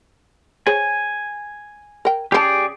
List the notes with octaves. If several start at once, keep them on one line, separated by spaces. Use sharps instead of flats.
G#4 C5 C#5 G#5
A#4 G5
C#3 C4 G4 G#4 D5 A5